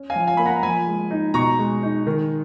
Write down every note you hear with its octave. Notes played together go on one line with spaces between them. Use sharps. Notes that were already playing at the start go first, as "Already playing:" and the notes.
Already playing: C#4
F5 G#5
F3
F5 G#5
A#3 B5
F#5 A#5
F3 G#5 B5
G#3
D#4
B2 A#5 C#6
G#3
D#4
D#3